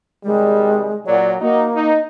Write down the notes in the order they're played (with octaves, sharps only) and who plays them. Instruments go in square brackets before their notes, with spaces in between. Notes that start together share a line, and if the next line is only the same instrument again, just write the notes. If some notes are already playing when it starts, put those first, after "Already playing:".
[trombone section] C3 D#3 G3 [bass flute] G#3
[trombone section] A#2 F#3 [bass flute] D5
[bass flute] A#3 [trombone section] D#4 F#4
[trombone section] D#4